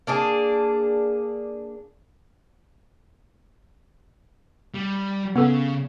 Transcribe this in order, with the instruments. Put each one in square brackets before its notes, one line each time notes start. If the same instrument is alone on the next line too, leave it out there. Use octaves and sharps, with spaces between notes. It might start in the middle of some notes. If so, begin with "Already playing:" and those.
[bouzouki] A#3 D4 G#4
[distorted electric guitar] G3
[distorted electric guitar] C#3 [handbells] B3 A4